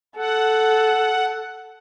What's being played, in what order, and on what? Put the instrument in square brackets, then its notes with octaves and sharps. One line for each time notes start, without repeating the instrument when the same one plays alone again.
[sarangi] A4 [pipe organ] F#5